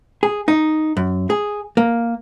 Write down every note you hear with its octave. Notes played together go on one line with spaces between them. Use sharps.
G#4
D#4
F#2
G#4
A#3